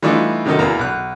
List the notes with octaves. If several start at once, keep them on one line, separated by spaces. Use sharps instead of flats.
E3 G3 A3 D4 D#4 F4
C3 D#3 F#3 D#4 A4
E2 E3 A#3 A#5
B1 F#6